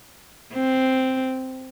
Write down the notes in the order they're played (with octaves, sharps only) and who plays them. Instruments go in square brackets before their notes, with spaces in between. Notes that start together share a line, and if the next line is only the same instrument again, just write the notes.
[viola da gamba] C4